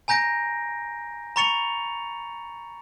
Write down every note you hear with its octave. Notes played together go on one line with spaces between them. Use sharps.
G#5 A#5 G6 A#6 D7
A#5 B5 C#6 A6 C#7 F7